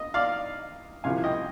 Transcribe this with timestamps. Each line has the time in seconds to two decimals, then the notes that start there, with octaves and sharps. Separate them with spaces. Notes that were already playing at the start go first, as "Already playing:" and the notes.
Already playing: D#5
0.14 D5 F5
1.04 C2 C3 F3 F5 G#5
1.24 D#5 G5